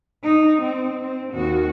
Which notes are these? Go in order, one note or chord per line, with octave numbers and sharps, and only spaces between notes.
D#4
C4
C4
D#2 F#4